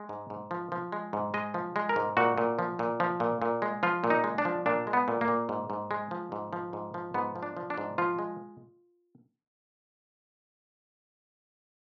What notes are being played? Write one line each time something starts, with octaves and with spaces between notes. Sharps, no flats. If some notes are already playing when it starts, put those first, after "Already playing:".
Already playing: G#3
G#2
G#2
F3
F3
G#3
G#2
G#3 D#5
F3
G#3
A#4
G#2
A#2 F#4
A#2
F3
A#2
F3
A#2
A#2
G#3
F3 F4
A#2
D#4
G#3
D4
F3
A#2 D4
G#3
B3
A#2
A#3
A#2
G#2
G#2
G#3
F3
G#2
F3
G#2
F3
G#2 B3
F3
D4
F3
D4
G#2
F3 F4
G#3